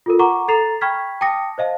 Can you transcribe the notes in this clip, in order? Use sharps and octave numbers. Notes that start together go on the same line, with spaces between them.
F4 A4 A#4
F#5 A#5 C#6 D6
A4 A#5 A6 C7 F7
G5 B5 C#6 F6 G#6 B6
G5 A5 D6 D#6 A#6 C#7
C5 D#5 F5 A5